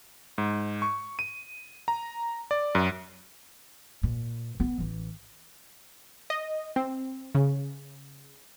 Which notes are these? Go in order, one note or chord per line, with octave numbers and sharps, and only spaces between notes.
G#2
C#6
D#7
A#5
D5
F#2
A#2
B3
A1 E3
D#5
C4
C#3